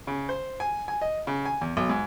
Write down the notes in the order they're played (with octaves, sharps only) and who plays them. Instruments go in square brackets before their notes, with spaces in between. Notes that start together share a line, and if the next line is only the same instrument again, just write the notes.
[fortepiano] C#3
C5
G#5
G#5
D#5
C#3
G#5
E2
B1
G#2